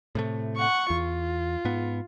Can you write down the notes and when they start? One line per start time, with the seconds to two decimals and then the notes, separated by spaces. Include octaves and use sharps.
0.15 A2 C3 A3
0.56 F#5 C#6
0.90 E2 F4
1.65 G#2 B3